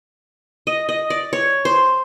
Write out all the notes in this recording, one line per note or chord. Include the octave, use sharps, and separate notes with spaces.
D#5
D#5
D5
C#5
C5